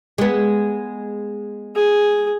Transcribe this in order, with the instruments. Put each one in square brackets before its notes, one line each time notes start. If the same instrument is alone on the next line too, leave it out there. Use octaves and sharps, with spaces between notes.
[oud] G#3 B3
[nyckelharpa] G#4